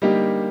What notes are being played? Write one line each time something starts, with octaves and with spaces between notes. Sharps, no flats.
D3 G3 A#3 D#4 G4